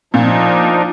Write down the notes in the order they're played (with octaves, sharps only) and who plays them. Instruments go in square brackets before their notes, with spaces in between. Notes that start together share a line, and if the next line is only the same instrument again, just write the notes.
[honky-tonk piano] A#2 [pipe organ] F3 D4 D#4